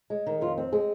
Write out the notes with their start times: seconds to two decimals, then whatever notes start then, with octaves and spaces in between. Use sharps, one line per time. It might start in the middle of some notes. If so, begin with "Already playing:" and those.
0.10 G#3
0.27 D#3
0.41 F2 F4
0.58 C4
0.72 G#3 G#4